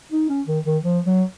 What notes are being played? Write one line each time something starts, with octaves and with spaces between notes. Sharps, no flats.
D#4
C#4
D#3
D#3
F3
F#3